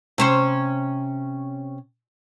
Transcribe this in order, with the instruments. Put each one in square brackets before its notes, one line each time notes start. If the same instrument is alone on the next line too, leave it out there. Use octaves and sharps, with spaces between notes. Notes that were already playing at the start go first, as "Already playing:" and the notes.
[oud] C3 C#4 C5